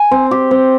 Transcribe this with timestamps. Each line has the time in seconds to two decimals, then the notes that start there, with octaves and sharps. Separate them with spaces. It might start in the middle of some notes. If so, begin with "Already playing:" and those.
Already playing: G#5
0.11 C4
0.31 G4
0.51 C4